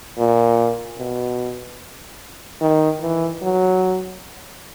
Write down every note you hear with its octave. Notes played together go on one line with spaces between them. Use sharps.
A#2
B2
D#3
E3
F#3